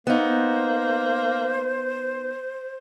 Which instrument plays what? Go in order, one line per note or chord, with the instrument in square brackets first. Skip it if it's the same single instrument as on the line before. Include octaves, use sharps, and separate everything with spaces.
[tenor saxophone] A#3 [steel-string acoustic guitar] B3 D#4 [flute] C5